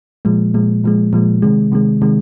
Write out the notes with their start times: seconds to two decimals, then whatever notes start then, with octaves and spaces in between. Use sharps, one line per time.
0.25 A#2 F3 G#3
0.54 A#2 F3 G#3
0.84 A#2 F3 G#3
1.13 A#2 F3 G#3
1.42 C3 D#3 G#3
1.72 C3 D#3 G#3
2.02 C3 D#3 G#3